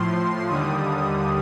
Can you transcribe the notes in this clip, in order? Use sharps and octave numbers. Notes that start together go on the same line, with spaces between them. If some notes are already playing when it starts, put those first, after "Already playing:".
Already playing: A2 F3 C6
D#2 D3 G3 D#6